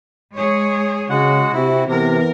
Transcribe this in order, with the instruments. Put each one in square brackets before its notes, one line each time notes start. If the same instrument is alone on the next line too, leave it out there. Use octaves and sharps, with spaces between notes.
[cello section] G#3 G#4 C#5
[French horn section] C#3 [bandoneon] G#3 F#5 [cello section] F#4
[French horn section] C3 [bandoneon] E4
[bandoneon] C3 [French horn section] E3 B3 [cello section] A#4